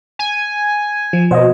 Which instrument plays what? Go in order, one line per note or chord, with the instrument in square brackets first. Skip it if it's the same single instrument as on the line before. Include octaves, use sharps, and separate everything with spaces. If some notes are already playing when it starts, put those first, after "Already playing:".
[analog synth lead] G#5
[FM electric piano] F3
[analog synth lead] B2 [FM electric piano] C5 D#5